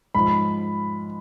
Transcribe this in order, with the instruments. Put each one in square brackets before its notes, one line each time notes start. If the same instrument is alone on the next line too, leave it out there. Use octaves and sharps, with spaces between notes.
[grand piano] G#2 F3 B5